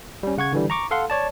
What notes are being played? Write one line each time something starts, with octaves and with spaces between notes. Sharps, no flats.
G3 C#4
C#3 F#5 C#6 G#6
D3 E3 G3
A#5 C#6 D6
A4 F5 F#5 C6
C#5 D5 A5